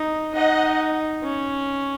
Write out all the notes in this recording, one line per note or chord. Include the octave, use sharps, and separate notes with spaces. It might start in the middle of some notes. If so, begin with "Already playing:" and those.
Already playing: D#4
D#4 D#5 F#5
C#4